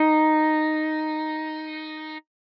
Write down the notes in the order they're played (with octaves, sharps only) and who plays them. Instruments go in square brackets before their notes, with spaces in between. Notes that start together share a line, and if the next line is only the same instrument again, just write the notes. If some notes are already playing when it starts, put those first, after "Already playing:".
Already playing: [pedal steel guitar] D#4